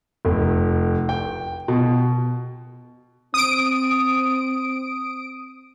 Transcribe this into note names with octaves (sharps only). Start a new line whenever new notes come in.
F1
G5
B2
C4 D#6 D7